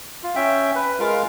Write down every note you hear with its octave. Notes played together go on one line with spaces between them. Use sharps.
F4
C#4 E5 G5
B4
G#3 F4 A#4 F5